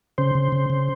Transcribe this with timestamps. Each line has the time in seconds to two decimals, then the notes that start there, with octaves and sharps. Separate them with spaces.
0.18 C#3 C5
0.35 C#3
0.52 C#3
0.70 C#3